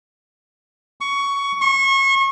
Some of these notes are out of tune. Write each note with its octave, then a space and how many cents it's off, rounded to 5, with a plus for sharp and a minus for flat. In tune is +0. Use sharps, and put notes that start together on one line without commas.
C#6 +15
C#6 -30